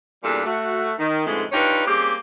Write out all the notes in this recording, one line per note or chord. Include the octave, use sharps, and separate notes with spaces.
E2 A#2 G3 D4 A4 F5
A3 F#4
D#3
F2 G#2 B2 D3 G#3 A3
D4 D#4 F4 G4 B4 C#5
G3 A#3 C4 C#4 G4 G#4